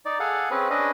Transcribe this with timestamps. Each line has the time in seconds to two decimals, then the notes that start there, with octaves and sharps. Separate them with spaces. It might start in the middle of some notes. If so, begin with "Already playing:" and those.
0.05 D#4 D5
0.20 G#4 A4 F5 F#5
0.51 C4 C#4 G#4 B4
0.70 C#4 D4 B4 D#5